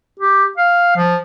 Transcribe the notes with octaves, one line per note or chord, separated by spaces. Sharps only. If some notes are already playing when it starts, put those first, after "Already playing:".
G4
F5
F3